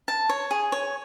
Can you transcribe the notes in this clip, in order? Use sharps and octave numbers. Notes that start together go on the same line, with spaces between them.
A5
C#5
G#4
C#5